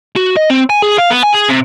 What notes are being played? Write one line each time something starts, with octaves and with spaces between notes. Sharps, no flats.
F#4
D#5
C4
G#5
G#4
F5
B3
G#5
G#4
C3